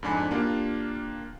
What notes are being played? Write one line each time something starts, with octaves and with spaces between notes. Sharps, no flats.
F2 G#2 D4 G#5 B5
A#3 D4 F4 G4